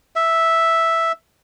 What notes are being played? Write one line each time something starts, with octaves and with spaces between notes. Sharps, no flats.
E5